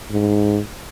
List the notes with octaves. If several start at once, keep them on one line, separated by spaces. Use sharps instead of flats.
G#2